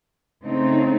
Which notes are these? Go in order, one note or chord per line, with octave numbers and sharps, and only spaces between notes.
C#3 A3 C4 D#4